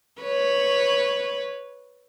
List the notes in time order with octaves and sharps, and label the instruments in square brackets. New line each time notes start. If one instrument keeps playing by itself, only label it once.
[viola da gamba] B4 [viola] C#5